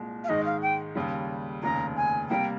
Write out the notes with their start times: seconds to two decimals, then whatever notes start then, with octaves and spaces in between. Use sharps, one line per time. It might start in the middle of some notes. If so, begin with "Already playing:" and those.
Already playing: C2 A#2 G#3
0.24 F5
0.29 G#2 D#3 G#3 D#4 G#4 D#5
0.45 F5
0.62 G5
0.95 D#2 C#3 G3
1.63 F1 D#2 C#3 A#5
1.96 G#5
2.29 C3 G3 A#3 G5